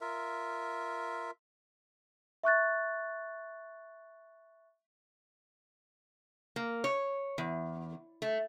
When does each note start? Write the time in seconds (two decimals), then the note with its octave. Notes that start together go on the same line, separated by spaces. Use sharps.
0.01 F4 A#4 E5
2.44 E5 C#6 F#6 A6
6.56 A#3
6.84 C#5
7.38 E2
8.22 A3